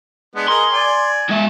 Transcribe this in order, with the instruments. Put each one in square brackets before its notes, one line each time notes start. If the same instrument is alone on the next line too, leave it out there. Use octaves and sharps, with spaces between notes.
[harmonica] G#3 B3 D4
[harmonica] G#4 A#4 D#5 [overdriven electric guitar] C6
[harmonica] D5 G#5
[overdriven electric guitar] G#3 E5